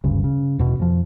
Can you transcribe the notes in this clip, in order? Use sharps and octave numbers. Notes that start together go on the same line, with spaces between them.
F#1 D2 G2 C#3
C#3
D#1 E2 B2
F2 F3